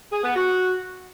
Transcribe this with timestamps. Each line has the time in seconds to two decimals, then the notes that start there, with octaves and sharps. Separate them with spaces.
0.12 G#4
0.24 B3
0.36 F#4